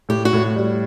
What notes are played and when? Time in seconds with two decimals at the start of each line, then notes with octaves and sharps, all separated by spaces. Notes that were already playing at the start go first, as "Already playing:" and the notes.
0.09 A2 G4
0.25 F#4
0.33 A2
0.56 G3